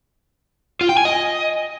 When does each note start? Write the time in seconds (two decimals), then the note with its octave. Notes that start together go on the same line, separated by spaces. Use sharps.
0.81 F4
0.89 G5
0.97 G#5
1.05 D#5